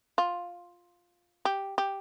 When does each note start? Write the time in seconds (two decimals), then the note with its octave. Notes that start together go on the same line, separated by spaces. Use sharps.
0.18 F4
1.45 G4
1.78 G4